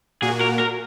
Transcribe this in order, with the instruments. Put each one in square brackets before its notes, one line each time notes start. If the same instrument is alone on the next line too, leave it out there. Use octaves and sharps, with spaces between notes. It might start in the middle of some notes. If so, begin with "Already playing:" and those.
[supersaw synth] A#2 A#3 F#4 [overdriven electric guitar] G#4
[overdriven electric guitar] A#4
A#4